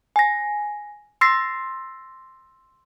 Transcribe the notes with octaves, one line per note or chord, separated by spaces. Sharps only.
G#5 A#6
C6 E6 A6 A#6 C7